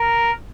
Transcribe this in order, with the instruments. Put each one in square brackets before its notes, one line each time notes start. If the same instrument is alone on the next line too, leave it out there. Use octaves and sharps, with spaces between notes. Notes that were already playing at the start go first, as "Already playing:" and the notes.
Already playing: [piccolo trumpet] A#4